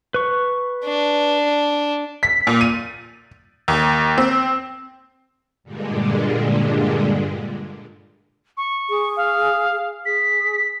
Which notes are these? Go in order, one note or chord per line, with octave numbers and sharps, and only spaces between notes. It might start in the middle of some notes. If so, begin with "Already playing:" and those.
B4 C#6
D4
B6
A#2
D#7
D#2
C4
G2 A#2 D3 G3 G#3
C#6
G#4
F5
G#4 B6